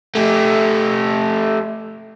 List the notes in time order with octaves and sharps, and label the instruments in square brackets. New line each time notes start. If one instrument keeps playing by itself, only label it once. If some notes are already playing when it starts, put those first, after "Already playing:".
[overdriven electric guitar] A3 G4